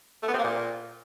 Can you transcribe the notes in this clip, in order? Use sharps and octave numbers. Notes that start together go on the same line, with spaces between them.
A3
B3
C4
A#3
A#2